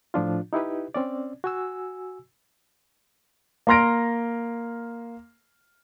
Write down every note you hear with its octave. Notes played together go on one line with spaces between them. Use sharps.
A2 F3 D4 F4
D#4 E4 G4 B4
C4 C#4 D5
F#4 G#5 E6
A#3 A#5 C6 F6 A#6 D7